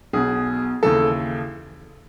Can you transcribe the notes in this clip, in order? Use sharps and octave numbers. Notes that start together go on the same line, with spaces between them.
B1 B2 G#4
D#2 C#3 E3 A4